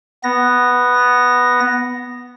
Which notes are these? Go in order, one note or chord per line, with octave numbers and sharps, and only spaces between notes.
B3 A#6